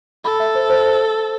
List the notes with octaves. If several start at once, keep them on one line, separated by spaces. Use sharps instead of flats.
A4 B5
E5
C5
C5